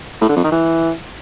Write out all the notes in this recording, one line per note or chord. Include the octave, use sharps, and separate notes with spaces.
A2
D3
F2
D#3
E3